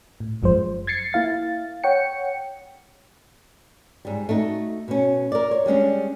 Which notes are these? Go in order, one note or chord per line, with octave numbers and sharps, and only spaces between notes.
A2
G1 F#2 F3 G#3 C5
G#6 A6 C7 C#7
A#3 E4 F5 A6
C#5 F#5 G5 C#7
G#2 G3
A3 D#4 F#4
B2 C#4
A#4 D5
C#5
G3 G#3 C#4 D4